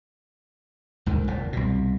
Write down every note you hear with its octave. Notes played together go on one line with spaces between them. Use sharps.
D2 G#2 D3 D#3
F1 A#2
C2 B2